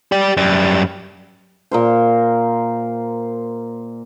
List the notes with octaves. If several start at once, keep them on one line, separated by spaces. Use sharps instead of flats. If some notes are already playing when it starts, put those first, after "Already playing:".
G4 D5
F#2 G3
A#2 A#4 C5